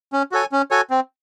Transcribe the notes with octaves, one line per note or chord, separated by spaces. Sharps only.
C#4
F#4 A4 C#5 G#5
C#4
F#4 A4 C#5 G#5
C4